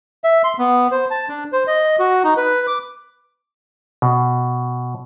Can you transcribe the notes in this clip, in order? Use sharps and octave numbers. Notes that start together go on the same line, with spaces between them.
E5
C6
B3
C5
A5
D4
C5
D#5
F#4
D#4
B4
D6
B2